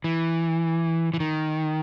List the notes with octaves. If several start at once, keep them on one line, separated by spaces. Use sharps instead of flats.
E3
E3
D#3